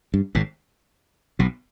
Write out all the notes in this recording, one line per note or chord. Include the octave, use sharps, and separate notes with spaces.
G2
G#1 G#2
B1 B2